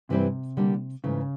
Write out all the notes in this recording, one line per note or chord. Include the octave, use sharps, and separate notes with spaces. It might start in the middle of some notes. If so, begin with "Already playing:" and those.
G2 C3 E3 G3 C4 E4
D3 G3 A#3 D4
G#2 C#3 E3 A3